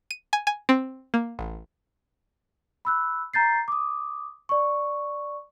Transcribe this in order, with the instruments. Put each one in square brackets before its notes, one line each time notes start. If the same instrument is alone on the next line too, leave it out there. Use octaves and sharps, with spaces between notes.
[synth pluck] D#7
G#5
G#5
C4
A#3
A1
[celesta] B5 E6 F#6
A#5 G6 A6 C7
D6 D#6
D5 C#6